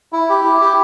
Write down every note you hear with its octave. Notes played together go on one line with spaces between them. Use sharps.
E4
G4
E4
G4